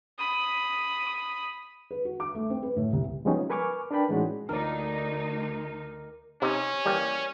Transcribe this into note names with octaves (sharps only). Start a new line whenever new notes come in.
B5 D#6
B4
F#4
D6
A3
C4
B4
A2
C2
F3 G3 G#3 B3 C#4 D#4
A#4 B4 G#5 C#6 D6 F6
D4 A#4 B4 D5 G5 B5
A2 E3 G#3 C#4 D#4 F#4
D2 D#4 A#4 D5
C3 C#4 D#4
E3 G3 A#3